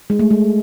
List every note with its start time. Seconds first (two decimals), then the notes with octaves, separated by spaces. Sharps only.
0.10 G#3
0.19 A3
0.30 G#3